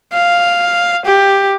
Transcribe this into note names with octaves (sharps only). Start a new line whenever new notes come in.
F5
G4